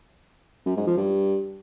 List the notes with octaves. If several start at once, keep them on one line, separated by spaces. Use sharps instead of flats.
F#2
G#2
F3
G2